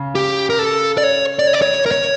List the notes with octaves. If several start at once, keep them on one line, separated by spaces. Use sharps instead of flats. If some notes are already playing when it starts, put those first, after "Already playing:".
Already playing: C#3
G4
A#4
A4
D5
C#5
D5
C#5
D5
C#5
A#4
C#5